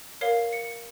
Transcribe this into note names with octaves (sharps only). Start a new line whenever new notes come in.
A#4 C#5 F5 C7
C#7